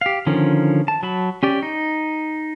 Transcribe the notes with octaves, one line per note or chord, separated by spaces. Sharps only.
G4 F5
D3 D#3 F3 C#4
A5
F#3 A5 B5
C#4 G4 D5
D#4